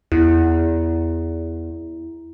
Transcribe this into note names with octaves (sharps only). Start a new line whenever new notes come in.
E2 E4